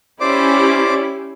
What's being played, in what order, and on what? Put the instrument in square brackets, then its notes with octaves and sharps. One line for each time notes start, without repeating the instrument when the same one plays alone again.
[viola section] C#4 E4 G4 [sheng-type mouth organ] C5 D5 D6